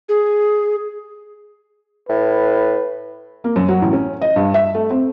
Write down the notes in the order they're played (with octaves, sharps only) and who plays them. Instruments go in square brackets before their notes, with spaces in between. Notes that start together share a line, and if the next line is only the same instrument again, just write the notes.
[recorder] G#4
[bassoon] A2 [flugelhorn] B4
[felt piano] A#3
F#2
F#3
A1
C#4
D#5
G2
E5
A3
C4